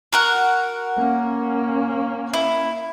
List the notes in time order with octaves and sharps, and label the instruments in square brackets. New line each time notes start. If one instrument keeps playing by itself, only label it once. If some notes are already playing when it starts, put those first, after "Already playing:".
[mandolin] F#4 A#4 F#5
[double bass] A#3 C#4
[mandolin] E4